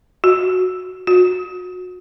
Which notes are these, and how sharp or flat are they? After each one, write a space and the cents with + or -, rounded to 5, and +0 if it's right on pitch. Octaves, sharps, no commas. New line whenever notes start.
F#4 -10
F#4 -30